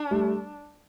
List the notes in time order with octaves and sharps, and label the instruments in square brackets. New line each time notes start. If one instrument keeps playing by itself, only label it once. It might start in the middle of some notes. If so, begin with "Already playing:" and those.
Already playing: [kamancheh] D4
[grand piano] G3 A3